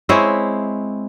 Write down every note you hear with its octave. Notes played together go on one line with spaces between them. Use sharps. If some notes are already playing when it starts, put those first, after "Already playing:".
G#3 C4 E4 C#5